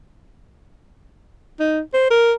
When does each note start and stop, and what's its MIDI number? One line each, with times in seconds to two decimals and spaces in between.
1.59 1.80 63
1.94 2.07 72
2.10 2.33 70